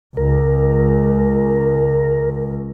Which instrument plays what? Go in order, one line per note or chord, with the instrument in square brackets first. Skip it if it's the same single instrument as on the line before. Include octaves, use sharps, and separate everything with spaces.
[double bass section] C#2 [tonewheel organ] A#4